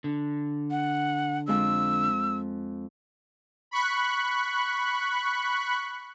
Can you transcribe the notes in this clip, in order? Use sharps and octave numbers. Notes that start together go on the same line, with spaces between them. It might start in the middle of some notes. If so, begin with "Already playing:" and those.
D3
F#5
F2 G#3 E6
B5 C#6 F#6